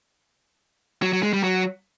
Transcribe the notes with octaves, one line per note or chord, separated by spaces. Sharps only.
F#3
F#3
G#3
G3
F#3